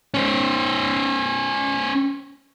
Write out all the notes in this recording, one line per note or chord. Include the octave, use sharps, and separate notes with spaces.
C#4 C5